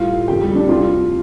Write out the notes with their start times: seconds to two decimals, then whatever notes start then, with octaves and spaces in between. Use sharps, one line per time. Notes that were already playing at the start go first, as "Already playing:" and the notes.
Already playing: A2 G3 F4 F5
0.28 F2 D3 A3 G4 G5
0.41 G3 G4
0.55 D4
0.69 D2 C3 G3 F4